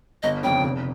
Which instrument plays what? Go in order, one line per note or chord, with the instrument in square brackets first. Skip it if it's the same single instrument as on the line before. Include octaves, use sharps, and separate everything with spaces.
[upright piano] G1 [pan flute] D#5
[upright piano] F2 C#3 [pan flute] G5
[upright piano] F1